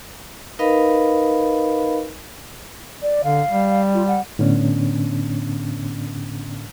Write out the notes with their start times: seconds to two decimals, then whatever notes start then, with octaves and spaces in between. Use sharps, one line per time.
0.59 D#4 A#4 B4 D#5 F5 B5
3.02 D5
3.24 D3 F5
3.51 G3
3.94 F4
4.07 F#5
4.39 A2 D3 B3 C#4 D4